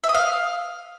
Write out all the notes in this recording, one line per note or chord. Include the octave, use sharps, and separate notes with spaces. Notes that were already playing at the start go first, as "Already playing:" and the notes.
E5
D#6
F5